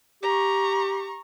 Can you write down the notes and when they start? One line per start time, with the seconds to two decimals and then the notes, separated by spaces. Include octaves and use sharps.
0.23 G4 A#5 C#6